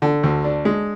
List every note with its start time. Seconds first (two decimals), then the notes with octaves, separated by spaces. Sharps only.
0.02 D3
0.23 D2
0.44 D4
0.65 G#3